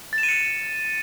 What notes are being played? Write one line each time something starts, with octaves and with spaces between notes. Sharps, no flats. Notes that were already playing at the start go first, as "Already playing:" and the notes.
A6
E7
D#7
C#7